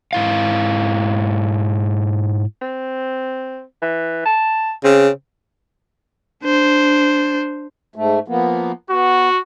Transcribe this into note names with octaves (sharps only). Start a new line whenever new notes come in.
G#2 E4 F5
C4
E3
A5
C#3 C4
D4 C5
G#2 A3
F3 A#3 B3
B3 F#4